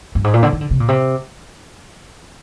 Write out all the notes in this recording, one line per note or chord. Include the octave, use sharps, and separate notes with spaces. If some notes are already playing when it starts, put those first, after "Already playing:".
G2
G#2
A#2
D3
D#3
D3
C3
A#2
C3